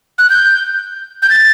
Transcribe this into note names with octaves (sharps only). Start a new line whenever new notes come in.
F#6
G6
G6
A6